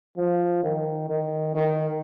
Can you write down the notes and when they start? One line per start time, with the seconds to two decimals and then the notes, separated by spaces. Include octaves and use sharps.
0.17 F3
0.63 D#3
1.09 D#3
1.55 D#3